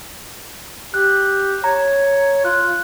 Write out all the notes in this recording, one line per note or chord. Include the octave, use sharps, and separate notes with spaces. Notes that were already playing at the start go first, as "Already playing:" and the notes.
G4 F#6
C#5 A#5
F4 F#6